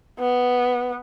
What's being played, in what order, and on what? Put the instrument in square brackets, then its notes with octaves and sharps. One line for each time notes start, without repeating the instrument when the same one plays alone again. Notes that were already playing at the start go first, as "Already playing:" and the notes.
[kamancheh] B3